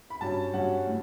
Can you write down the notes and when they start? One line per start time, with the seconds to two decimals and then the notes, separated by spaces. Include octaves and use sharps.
0.10 B5
0.21 G2 F#3 C#4 A5
0.54 G2 F#3 C#4 F#5
0.87 A2